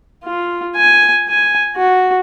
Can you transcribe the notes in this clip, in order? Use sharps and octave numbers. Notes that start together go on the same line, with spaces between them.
F4
G#5
G#5
F#4